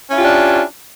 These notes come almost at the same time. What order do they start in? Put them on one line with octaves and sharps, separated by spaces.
C#4 E4 F4 G4 D4